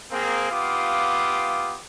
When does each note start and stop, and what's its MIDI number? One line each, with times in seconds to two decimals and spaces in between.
0.12 0.47 58
0.12 0.47 60
0.12 0.47 68
0.51 1.78 59
0.51 1.78 65
0.51 1.78 67
0.51 1.78 77
0.51 1.78 86
0.51 1.78 87